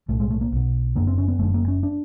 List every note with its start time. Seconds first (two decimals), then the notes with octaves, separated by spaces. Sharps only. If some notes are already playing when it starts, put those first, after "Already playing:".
0.08 B1 A2 A3
0.20 G#3
0.31 A3
0.41 A#3
0.52 B1 B2
0.96 F#1 F#2 D3 A#3
1.07 C4
1.18 C#4
1.28 B3
1.39 F#1 F#2 D3 A3
1.54 A#3
1.68 C#4
1.83 D4